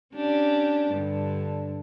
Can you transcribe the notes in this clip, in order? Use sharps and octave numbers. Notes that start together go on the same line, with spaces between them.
C#4 D4 G4
G2 D3